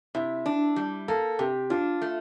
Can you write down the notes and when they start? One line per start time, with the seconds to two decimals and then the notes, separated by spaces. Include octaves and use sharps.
0.15 C3 E4
0.46 D4
0.76 G3
1.08 A#3 A4
1.39 C3 G4
1.70 D4 F4
2.02 A3